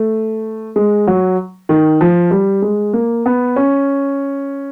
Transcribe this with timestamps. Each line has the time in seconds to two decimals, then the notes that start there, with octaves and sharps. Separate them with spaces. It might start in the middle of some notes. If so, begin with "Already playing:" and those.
Already playing: A3
0.76 G#3
1.07 F#3
1.69 D#3
2.01 F3
2.31 G3
2.62 G#3
2.93 A#3
3.26 B3
3.56 C#4